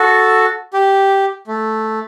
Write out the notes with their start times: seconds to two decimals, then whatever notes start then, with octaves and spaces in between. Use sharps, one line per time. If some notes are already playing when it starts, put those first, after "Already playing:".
Already playing: F#4 A4
0.73 G4
1.47 A3